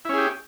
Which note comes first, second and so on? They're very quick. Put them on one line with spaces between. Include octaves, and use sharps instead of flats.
E4 C#4 G#4 G4